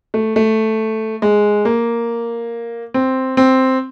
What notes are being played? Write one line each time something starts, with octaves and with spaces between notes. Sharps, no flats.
A3
A3
G#3
A#3
C4
C4